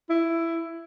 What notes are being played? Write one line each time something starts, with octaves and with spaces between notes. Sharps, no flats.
E4